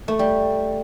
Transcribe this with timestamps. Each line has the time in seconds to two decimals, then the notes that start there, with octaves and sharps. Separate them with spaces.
0.08 A3
0.19 G3